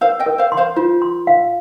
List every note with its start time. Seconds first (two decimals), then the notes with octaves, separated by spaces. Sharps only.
0.01 A#4 C5 F5
0.19 D#5 G5
0.26 A#4
0.38 C5 F5
0.52 C6
0.57 C5 F5
0.76 F4 C5
1.02 C6
1.27 F5